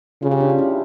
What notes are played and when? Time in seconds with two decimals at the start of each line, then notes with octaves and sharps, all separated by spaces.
0.22 C#3 F4
0.31 G4
0.40 D4
0.50 F4
0.59 E4